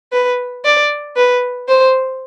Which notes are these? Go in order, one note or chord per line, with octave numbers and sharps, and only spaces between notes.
B4
D5
B4
C5